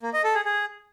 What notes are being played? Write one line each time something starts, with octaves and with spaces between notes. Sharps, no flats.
A#3
D#5
A4
G#4
G#4